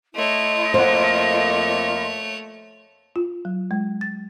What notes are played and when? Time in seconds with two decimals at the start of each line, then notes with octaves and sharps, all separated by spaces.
0.15 A3 E4 C#5 D#5 C6
0.74 F2 A#3 C5 F#5
3.16 F4
3.45 F#3
3.71 G#3
4.01 A6